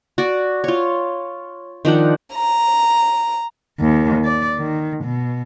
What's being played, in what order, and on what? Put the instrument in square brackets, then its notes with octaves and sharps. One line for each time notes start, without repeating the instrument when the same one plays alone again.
[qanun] F#4 D5
F4 C#5
D#3 F3 D4 F#5
[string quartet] A#5
[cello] D#2
D5
D#3
B2